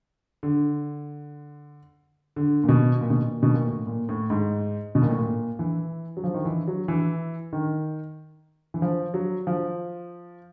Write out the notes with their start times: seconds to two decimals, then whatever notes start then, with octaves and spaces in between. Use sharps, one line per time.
0.43 D3
2.36 D3
2.64 A#2
2.69 B2
3.01 A#2
3.10 B2
3.20 A#2
3.43 B2
3.54 A#2
3.66 A2
3.87 A#2
4.09 A2
4.30 G#2
4.95 B2
5.02 A#2
5.10 A2
5.17 A#2
5.59 E3
6.17 F#3
6.24 F3
6.34 D#3
6.45 E3
6.68 F#3
6.88 E3
7.53 D#3
8.74 E3
8.82 F3
9.14 F#3
9.47 F3